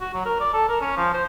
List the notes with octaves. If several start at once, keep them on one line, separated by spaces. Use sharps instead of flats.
F#4
F#3
A#4
D5
A4
A#4
C#4
F3
C5